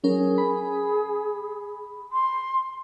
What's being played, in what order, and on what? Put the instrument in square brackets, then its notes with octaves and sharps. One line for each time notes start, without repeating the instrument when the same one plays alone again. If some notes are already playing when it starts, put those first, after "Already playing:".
[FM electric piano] F#3 C#4 A#4 [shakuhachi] G#4
[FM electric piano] B5
[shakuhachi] C6